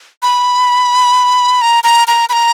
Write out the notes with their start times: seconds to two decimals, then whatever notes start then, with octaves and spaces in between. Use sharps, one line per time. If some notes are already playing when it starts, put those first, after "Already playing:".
0.23 B5
1.62 A#5
1.84 A#5
2.08 A#5
2.29 B5
2.33 A#5